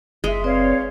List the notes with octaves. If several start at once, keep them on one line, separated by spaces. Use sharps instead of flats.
F#1 G#3 E5
C4 B4 C#5 D5 F5